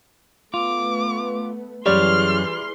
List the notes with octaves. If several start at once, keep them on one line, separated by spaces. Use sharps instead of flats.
A3 B3 F4 D6
F#2 E3 G3 G#4 C#5 D5 C6 F6